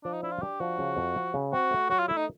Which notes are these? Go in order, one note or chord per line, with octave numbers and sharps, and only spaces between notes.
F3 D4
D#4
D4 E4
F4
D4 G4
F3 F#4
C#3
F2
F3
C#3
C4 F#4
A3
F#3 F#4
F4
A3 E4
D#4